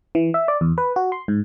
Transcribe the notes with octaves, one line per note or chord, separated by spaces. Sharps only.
E3
E5
D5
E2
B4
F#4
C6
G#2